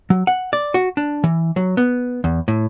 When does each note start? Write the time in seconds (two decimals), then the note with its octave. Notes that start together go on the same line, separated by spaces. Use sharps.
0.10 F#3
0.27 F#5
0.53 D5
0.74 F#4
0.97 D4
1.24 E3
1.56 F#3
1.77 B3
2.24 E2
2.48 A2